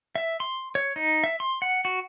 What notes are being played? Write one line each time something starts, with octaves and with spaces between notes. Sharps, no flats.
E5
C6
C#5
D#4
E5
C6
F#5
F#4